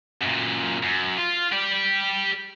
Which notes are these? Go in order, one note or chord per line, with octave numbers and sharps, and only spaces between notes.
F#2 A#2
F#2
F4
G4 D5